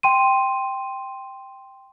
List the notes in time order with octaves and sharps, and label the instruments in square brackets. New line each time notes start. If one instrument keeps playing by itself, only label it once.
[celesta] G5 C6 D#7